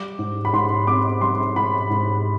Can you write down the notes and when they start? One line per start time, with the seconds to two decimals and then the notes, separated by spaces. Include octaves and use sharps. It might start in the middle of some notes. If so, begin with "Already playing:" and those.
Already playing: G3 D6
0.19 G#2
0.45 B5
0.53 G#2 C6
0.87 C4 D6
1.21 G3 C6
1.56 G#2 B5
1.90 G#2